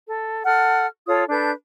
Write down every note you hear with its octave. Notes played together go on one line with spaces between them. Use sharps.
A4
A4 F#5 F6
F4 A4 C#5 D#6
D4 A4 B4 G6